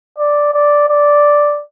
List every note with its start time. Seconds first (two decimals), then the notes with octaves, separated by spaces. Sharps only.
0.18 D5
0.54 D5
0.89 D5